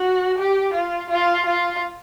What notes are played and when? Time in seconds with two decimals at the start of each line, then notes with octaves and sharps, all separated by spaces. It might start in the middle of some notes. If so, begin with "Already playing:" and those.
Already playing: F#4
0.38 G4
0.73 F4
1.10 F4
1.46 F4